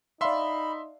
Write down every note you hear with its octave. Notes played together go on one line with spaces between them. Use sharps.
D#4 D5 E5 F5 B5 C6